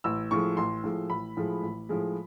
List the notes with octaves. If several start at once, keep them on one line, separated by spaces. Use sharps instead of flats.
A1 E6
A2 F3 G#3 C#6
A1 C6
A2 F3 G#3
A1 B5
A2 F3 G#3
A1
A2 F3 G#3